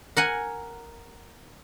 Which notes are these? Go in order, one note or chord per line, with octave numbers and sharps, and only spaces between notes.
A#4 F#5 G#5